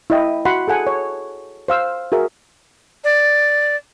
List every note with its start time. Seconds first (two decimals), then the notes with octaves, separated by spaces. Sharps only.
0.10 E4 D#5 G5
0.45 F#4 F#5 B5 C6
0.68 G#4 A4 F#5 G#5
0.87 C#5
1.68 C5 F5 E6
2.12 F#4 G#4 A#4 E5
3.04 D5